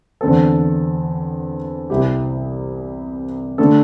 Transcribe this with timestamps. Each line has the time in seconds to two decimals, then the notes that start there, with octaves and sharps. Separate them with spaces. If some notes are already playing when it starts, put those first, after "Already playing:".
0.21 E2 D3 C4 A4
1.90 C2 C3 G3 E4 G4
3.58 D3 A3 D4 A4